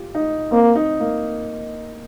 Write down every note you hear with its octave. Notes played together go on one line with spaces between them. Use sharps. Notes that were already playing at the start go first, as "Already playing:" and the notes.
Already playing: F4 G4
D#4
A#3 C4
D#4
A#3